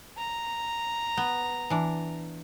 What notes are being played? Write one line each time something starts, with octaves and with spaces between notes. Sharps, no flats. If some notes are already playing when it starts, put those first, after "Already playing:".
A#5
B3
E3 D4